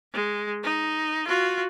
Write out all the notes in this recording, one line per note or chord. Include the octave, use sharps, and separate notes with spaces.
G#3
D#4
F4 F#4